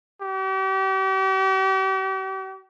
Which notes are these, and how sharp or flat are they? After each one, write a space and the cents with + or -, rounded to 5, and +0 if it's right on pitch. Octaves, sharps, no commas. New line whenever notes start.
G4 -40